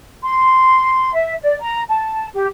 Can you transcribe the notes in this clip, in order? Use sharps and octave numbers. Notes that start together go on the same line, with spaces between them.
C6
E5
D5
A#5
A5
G4